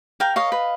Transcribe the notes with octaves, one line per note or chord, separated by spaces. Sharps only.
A#4 F5 G5
C#5 D#5 F5
B4